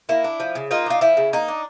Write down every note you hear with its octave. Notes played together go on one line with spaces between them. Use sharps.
A#3 E4
D4
F3
C#3
A#3 D#4 F4
D4 F4
F3 E4
C#3
A#3 D#4
D4